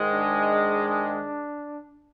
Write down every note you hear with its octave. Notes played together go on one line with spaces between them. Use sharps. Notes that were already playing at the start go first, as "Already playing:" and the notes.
Already playing: G#2 D#3 G#3
D4